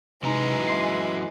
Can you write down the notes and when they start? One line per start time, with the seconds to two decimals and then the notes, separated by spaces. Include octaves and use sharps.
0.23 F#2 C3 E3 G#3 D#4 B4 A#5
0.67 E5 C6 C7